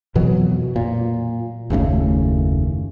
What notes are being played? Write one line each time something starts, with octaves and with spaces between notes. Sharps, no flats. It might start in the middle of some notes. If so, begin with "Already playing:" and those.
F2 B2 E3 F#3
A#2
F#1 D#2 C#3 A3